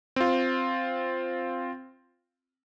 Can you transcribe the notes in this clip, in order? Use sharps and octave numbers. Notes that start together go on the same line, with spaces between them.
C4 F4